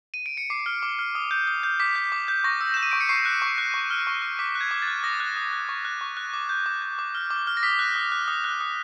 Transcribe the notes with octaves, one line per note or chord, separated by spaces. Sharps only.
D#7
D7
C#7
D6 C7
F6
D6
F6
D#6
G6
D#6
G6
D6 B6
G6
D6
G6
C#6 A#6
E6
G6 E7
D#7
C#6 D7
C#7
C#6 C7
F#6
C#6
F#6
C#6
F6
C#6
F6
D6 B6
F#6
G#6
D6
A6
F#6
D#6 A#6
F#6
D#6
F#6
C#6
F#6
C#6
F#6
D6
G6
D6
G6
D6
F6
D6
F6
A#6
D#6 B6
F#6
D#6
F#6
D#6
F#6
D#6